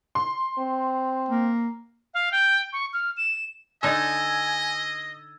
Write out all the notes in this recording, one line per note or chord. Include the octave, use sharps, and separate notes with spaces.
C6
C4
A#3
F5
G5
C#6
F6
E7
D3 D#4 D#5 G#5 E6 G#6 A6